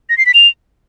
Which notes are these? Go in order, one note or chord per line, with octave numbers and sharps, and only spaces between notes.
A#6
C7
B6
F7